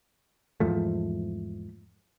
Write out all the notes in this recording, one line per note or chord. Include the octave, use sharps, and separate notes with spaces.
E2 G#2 F3 A3